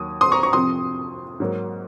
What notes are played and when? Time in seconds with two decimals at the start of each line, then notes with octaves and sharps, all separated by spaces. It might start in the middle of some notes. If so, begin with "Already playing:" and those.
Already playing: D#2 D#3 F#3 D#6
0.21 C6 D#6
0.32 A#5 C#6
0.43 A#5 C#6
0.53 F2 C3 F3 C6 D#6
1.40 G#2 F#3 A#3